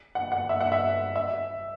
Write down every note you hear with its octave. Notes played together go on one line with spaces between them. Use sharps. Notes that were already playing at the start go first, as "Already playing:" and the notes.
F#5
F#5
E5
F#5
E5
E5